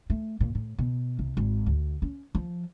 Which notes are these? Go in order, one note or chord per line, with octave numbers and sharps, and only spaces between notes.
A3
A#2
A2
B2
C2
G#1
D2
C#4
F3